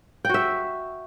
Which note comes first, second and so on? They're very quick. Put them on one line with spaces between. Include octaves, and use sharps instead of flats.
G5 F#4 E5